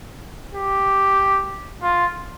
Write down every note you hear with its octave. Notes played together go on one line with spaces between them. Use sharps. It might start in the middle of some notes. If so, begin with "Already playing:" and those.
G4
F4